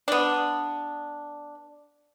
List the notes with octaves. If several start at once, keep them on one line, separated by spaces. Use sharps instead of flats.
B3 D4